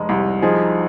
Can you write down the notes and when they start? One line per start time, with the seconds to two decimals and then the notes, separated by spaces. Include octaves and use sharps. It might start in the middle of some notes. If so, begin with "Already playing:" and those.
Already playing: F1 G#3
0.09 C2
0.42 F3 D#4 G#4